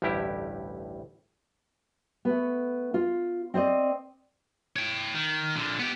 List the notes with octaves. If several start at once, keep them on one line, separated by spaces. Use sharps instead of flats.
A1 D2 G2 G3 E4 G4
A3 B3
F4
C4 C5 D5 D#5
C#5 G5
D#3
A#2 D3
B3 G4